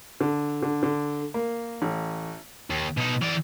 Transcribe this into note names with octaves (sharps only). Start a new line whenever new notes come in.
D3
D3
D3
A#3
A1
D#2
B2 D#4
E3 D5